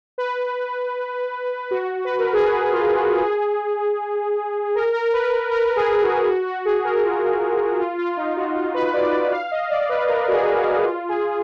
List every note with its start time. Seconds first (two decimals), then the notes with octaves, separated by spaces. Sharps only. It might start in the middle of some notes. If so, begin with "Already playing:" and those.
0.18 B4
1.71 F#4
2.05 B4
2.19 A#4
2.33 G#4
2.47 F#4
2.73 F4
2.97 F#4
3.23 G#4
4.75 A#4
4.94 A#4
5.13 B4
5.31 A#4
5.51 A#4
5.58 B4
5.65 A#4
5.76 G#4
6.02 F#4
6.28 F#4
6.46 F#4
6.65 G#4
6.85 A#4
7.04 F4
7.80 F4
7.99 F4
8.17 D#4
8.37 F#4
8.56 F4
8.74 B4
8.94 D5
9.13 D5
9.31 F5
9.51 D#5
9.70 D5
9.89 B4
10.08 A#4
10.28 F#4
10.33 G#4
10.59 F#4
10.85 F4
11.09 G#4